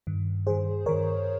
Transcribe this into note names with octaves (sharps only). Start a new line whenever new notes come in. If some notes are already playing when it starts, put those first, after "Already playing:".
G2 D#3
G2 D#3 G#4 C5
G2 D#3 A#4 C#5